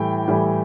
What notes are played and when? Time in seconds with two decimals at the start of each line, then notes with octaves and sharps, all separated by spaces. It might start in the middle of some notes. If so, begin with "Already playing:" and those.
Already playing: A2 E3 G3 G5
0.28 A2 E3 G3